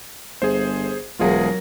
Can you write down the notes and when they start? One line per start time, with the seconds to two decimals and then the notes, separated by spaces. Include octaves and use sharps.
0.42 G1 G#4 C5
1.19 E1 F#3 F4 G#4 A#4